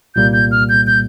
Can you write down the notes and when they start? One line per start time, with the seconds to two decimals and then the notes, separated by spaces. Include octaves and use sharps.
0.15 C2 A#2 G3 A#3 G6
0.33 G6
0.51 F6
0.69 G6
0.87 G6